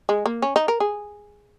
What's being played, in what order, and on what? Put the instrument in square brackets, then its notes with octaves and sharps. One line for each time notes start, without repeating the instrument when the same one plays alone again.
[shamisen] G#3
A#3
C#4
D#4
A#4
G#4